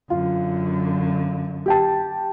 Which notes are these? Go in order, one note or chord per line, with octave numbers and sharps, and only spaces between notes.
F#2 D3 F4
G4 G5 A5